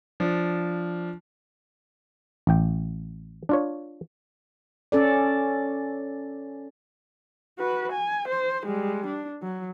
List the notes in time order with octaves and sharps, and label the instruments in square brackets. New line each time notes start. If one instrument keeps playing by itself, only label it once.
[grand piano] F3 D4
[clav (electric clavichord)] A1 G5
D4 F4 C#5
[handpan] C#4 A4 D5
[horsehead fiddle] F#4 B4
G#5
C5
G3 G#3
D4
F#3